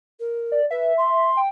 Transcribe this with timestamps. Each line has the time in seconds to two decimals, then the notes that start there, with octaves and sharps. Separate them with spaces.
0.19 A#4
0.52 D5
0.71 B4 E5
0.97 C6
1.37 G5